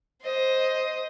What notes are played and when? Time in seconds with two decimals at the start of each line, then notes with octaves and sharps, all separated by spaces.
0.22 C5 D#5